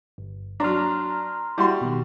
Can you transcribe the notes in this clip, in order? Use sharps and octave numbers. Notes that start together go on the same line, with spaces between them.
G1
F#3 D4 A#5 C6 F6
G3 E4 F#4 C6
B2 D#3